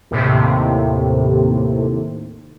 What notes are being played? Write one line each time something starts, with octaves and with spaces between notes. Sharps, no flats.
D#2 A2 C3